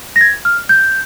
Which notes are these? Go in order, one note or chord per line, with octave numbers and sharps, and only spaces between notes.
A#6
G#6
F6
G6